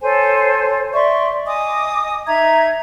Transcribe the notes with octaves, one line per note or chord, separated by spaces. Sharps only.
A4 C5 C#5 G#5
D5 E5 C6 C#6
D#5 G#5 D6 D#6
D#4 E5 A#5 G#6